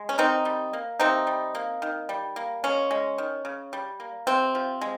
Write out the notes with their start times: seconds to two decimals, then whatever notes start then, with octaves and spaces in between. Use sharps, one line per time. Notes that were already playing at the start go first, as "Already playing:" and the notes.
Already playing: G#3
0.09 C#4
0.18 D#3 C4 D#4
0.45 G3
0.73 A#3
1.00 C3 C4 D#4
1.27 G3
1.55 A#3
1.82 D#3
2.09 G3
2.36 A#3
2.64 G#3 C#4
2.91 G#3
3.18 D#3
3.45 C#3
3.73 G3
4.00 A#3
4.27 C3 C4
4.55 F3
4.81 G#3